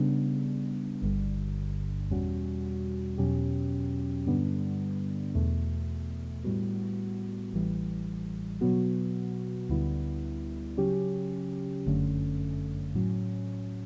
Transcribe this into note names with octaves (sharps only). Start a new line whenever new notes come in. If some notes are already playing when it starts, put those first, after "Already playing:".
Already playing: C#3 G3 B3 D4
G1 G2 D3 G3
E2 B2 G3 C#4 F#4
E2 B2 F#3 C#4 G4
G2 D3 G3 B3 D4
E2 B2 A3
A2 G3 B3 F#4
A1 A2 E3 G3
B2 F#3 B3 F#4
D2 D3 G3 B3 E4
C#3 F#3 C#4 G4
G1 F#2 D3 A3 C#4
A2 F#3 C#4